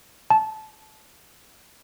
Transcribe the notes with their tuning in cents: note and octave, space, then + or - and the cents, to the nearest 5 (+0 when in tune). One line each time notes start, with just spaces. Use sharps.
A5 -20